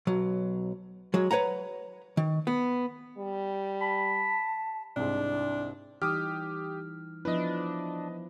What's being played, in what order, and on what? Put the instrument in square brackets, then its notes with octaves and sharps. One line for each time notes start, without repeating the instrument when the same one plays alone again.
[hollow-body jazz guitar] B1 F#3
F#3 G#3
B4 C#5 F#5 A#5
D#3
B3
[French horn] G3
[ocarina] A5 [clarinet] B5
[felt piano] C2 G#2 [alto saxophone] D4
[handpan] E3 G3 D#4 [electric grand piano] G4 D6 D#6 [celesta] F6
[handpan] F3 B3 E4 [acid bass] D4 [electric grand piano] B4 D#5